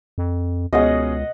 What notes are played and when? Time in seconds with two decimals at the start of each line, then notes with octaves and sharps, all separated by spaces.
0.18 F2
0.73 C#2 B2 C#4 G#4 D#5 F#5